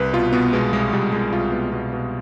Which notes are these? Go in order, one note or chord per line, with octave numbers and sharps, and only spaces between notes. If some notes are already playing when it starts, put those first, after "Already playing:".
Already playing: C2 B4
B2 F4
B2 B3
B2 G#3
C2 G#3
C2 G3
C2 G#3
C2 F4
B2
B2
B2